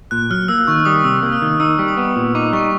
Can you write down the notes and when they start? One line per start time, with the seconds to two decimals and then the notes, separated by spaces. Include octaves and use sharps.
0.11 A#2 F#6
0.30 F#3 F6
0.48 A#3 E6
0.67 D#3 C#6
0.85 G3 D#6
1.04 C3 E6
1.23 A#3
1.32 F6
1.42 D#3
1.60 D#4 E6
1.79 G3
1.88 D#6
1.97 B3
2.16 A#2
2.35 D#4 D6
2.53 G3 C#6